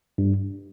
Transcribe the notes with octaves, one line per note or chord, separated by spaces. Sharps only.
G2